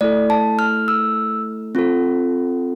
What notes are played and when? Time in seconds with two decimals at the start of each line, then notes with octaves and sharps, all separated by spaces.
0.01 A3 E4 A4 D5
0.30 A5
0.59 F6
0.88 E6
1.75 C4 F4 A4